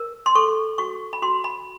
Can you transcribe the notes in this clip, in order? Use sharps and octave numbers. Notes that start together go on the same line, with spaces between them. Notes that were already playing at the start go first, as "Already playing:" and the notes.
Already playing: A#4
C6
A4 C#6
F#4 C#6
B5
F#4 C6
B5